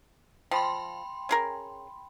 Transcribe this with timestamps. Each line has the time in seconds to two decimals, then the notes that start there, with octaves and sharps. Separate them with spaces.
0.51 F3 G5 B5 C6
1.29 C#4 G#4 A#4